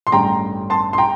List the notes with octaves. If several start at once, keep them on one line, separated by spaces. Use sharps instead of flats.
C6
A1 G2 D3 G3 G5 A#5
A5 C6
C6
G5 A#5